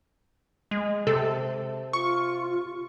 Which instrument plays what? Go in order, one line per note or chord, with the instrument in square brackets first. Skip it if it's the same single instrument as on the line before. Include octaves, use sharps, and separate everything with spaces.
[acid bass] G#3
[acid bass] C3 [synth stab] A4
[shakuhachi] F4 [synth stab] C#6